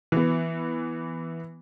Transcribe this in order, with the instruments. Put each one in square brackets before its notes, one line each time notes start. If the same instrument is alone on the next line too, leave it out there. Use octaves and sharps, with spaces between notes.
[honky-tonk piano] E3 B3